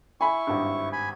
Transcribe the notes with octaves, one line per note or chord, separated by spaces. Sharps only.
E4 G#5 B5 C#6
G#1 G2
G#5 B5